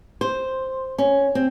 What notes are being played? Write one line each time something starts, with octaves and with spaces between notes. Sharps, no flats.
C5
C#4
C4